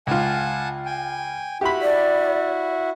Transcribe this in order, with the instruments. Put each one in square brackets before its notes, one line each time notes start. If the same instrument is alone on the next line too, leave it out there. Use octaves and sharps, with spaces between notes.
[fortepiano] C#2 F4 [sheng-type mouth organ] F#5 G#5 A5
[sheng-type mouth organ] G5 G#5
[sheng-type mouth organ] E4 F#4 [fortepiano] G4 B5
[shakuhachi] D5